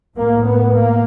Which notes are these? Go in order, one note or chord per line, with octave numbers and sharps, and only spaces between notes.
A2 A#3
B3
A#3